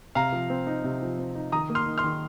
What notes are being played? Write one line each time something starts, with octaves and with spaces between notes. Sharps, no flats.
C3 F5 A#5
F3
C4
D#4
C3
F3
C4
D#4
D#3 A#5 D#6
A#3
C6 F6
D#4
C6 F6
D#3